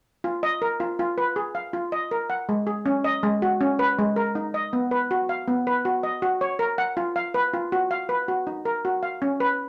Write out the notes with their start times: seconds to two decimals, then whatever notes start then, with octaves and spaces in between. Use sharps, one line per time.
0.24 F4
0.43 D#5
0.62 A#4
0.80 F4
0.99 F4
1.18 B4
1.36 G#4
1.55 F5
1.73 F4
1.92 D#5
2.11 A#4
2.30 F#5
2.49 G#3
2.67 G#4
2.86 C#4
3.04 D#5
3.23 G#3
3.42 F#4
3.61 C#4
3.79 B4
3.99 G#3
4.16 A#4
4.35 D#4
4.54 D#5
4.73 B3
4.91 B4
5.11 F#4
5.29 F5
5.48 B3
5.67 B4
5.85 F#4
6.03 D#5
6.22 F#4
6.41 C#5
6.59 A#4
6.78 F#5
6.97 F4
7.16 F5
7.34 B4
7.54 F4
7.72 F#4
7.91 F5
8.09 B4
8.28 F#4
8.47 D#4
8.65 A#4
8.85 F#4
9.03 F5
9.22 C#4
9.40 B4